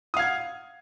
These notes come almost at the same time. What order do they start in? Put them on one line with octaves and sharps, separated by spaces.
D#6 F5 G#6 F#5